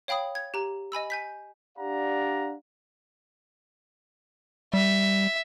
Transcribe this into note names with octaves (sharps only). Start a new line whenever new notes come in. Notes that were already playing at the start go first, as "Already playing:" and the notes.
C#5 F5 G5 B5 D#6
G#6
G4 A#5
D#5 G#5 B5 E6
G#5 G6 B6
D4 G4 D5 F5 F#5 A#5
G3 E5